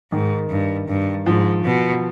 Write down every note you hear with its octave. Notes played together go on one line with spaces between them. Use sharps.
G#2 D#3
G2
G2
G#2 F3
B2